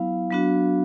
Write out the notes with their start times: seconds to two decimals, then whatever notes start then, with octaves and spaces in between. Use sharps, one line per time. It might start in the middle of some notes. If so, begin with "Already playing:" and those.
Already playing: F#3 B3 E4 F5
0.31 F#3 B3 D4 F#4